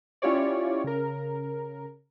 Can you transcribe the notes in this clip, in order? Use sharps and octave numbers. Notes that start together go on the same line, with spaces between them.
C#4 E4 F4 G4 C#5 D5
C#3 A#4